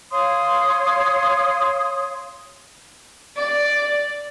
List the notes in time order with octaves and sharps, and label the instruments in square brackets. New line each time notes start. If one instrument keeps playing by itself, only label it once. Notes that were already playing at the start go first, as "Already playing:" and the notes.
[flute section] C#5 F5 C6 D#6
[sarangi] D5